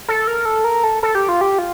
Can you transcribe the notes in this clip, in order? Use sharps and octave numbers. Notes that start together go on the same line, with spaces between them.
A4
A#4
A4
A#4
A4
A4
G4
F4
G4
F4